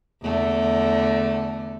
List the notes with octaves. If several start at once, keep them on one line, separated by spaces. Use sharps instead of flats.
E2 D3 A3